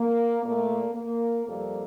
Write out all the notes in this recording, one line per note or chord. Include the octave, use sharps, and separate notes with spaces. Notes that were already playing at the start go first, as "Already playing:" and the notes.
Already playing: A#3
A#2 A3 A#3
A#3
F2 C3 G3 A#3 A4